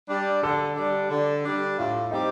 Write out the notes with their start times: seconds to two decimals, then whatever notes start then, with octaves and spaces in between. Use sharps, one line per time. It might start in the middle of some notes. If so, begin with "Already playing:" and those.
0.08 G3 D4
0.43 D3 A4
0.76 G3 D4
1.10 D3
1.44 G3 D4
1.78 A2 F4
2.11 G3 C4 D#4 G4